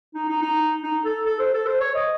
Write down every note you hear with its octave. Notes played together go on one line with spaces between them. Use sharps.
D#4
D#4
D#4
D#4
A4
A4
C5
A4
C5
C#5
D#5